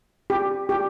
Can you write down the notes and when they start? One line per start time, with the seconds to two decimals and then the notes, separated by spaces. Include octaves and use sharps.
0.30 G4
0.69 G4